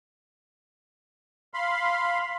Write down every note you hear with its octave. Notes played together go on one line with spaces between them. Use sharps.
F5 B5 C6